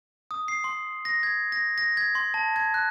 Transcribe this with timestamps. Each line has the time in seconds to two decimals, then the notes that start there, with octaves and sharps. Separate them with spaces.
0.31 D#6
0.48 C7
0.64 C6
1.05 A#6
1.23 G#6
1.52 A#6
1.78 A#6
1.97 G#6
2.15 C6
2.34 A5
2.56 G#6
2.74 F#6